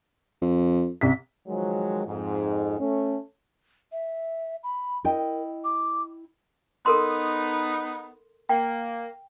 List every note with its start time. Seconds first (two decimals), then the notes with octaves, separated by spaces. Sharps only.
0.41 F2
1.01 C2 B6
1.48 D#3 F3 F#3 G#3
2.07 F2 G#2
2.79 A3 C#4
3.92 E5
4.64 B5
5.04 E4 A#4 D#5 G5
5.64 D6
6.86 B3 D#4 A4 A#4 C6
8.49 A#3 G5